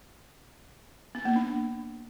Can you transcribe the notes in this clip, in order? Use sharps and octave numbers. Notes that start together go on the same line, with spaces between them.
B3
A#3
D4